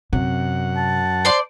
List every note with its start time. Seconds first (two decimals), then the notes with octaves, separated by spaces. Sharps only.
0.13 F#2 C3 F#5
0.76 A5
1.25 C5 D5 C6